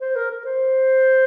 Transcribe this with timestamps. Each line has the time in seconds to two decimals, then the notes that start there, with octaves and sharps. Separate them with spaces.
0.01 C5
0.16 A#4
0.31 A#4
0.45 C5